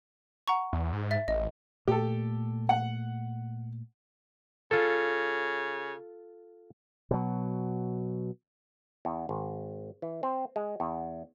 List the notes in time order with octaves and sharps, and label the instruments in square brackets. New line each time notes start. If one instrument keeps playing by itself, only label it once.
[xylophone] F#5 A#5 C#6
[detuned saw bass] E2
G#2
[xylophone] E5 A6
[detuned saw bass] A1 [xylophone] D#5
[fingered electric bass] A#2 A3 [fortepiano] G4 A4
[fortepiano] F#5
[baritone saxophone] C#3 [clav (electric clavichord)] F4 A4
[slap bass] B2 F#3
[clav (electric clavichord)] E2
G#1
E3
C4
G#3
E2